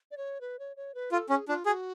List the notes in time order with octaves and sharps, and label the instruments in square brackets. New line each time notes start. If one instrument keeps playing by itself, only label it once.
[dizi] D5
C#5
B4
C#5
C#5
B4
[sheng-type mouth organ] F4 [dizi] A4
[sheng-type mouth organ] C#4 [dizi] G#4
[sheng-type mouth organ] D4 [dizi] F4
[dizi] F#4 [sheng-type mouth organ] G#4